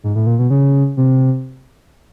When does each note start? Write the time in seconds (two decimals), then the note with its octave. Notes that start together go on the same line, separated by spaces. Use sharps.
0.04 G#2
0.15 A2
0.26 A#2
0.39 B2
0.50 C#3
0.97 C3